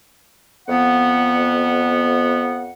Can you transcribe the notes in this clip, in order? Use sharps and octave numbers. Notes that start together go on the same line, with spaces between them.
F2 B3 F#5